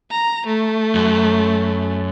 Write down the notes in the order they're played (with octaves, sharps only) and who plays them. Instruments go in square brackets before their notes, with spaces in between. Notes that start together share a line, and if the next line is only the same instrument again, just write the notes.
[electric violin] A#5
A3
[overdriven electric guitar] F#2